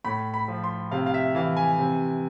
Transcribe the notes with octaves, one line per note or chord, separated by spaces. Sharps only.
A2 B5
B5
F3
C6
C3 F5
F5
E5
E3 F5
G#5
C3